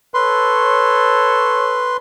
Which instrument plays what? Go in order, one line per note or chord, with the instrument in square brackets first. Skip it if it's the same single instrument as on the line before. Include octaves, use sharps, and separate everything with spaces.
[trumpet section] A4 C#5 [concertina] B4 C6